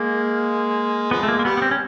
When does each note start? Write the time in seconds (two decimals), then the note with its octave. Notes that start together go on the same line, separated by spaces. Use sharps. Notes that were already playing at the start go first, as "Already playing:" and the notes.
Already playing: G#3 A#3
1.11 F3 G#3 B3
1.23 A3
1.28 A#3
1.39 A#3
1.45 G3 B3
1.57 B3
1.62 C4
1.71 C#4